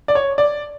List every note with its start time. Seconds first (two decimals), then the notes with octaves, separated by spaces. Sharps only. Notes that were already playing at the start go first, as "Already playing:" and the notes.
0.08 D5
0.15 C#5
0.38 D5